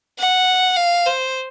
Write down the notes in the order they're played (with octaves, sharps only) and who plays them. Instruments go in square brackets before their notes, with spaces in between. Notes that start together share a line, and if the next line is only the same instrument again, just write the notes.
[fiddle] F#5
F5
C5